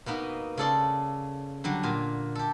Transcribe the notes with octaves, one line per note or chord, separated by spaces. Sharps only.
B2 A#3 B3 D#4
C#3 A4 D5 C6
D3 F#3 G3
A#2 F4 G#5
G4 A4